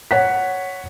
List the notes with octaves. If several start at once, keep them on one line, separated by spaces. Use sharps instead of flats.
C#5 F#5 B6